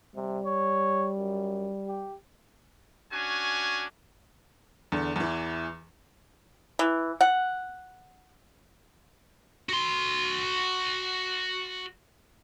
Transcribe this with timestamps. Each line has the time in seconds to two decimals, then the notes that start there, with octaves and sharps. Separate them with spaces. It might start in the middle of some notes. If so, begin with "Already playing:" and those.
0.16 C3 G3
0.46 C#5
1.18 F#2
1.87 G4
3.12 C#4 D4 F#4 G#5
4.92 E2 D3
5.16 E2 E3
6.79 E3
7.21 F#5
9.69 F#4 C6